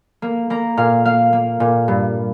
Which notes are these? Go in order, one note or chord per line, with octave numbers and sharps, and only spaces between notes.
A#3
A#3 A#5
A#2 F5
A#3 F5
A#3
A#2
G2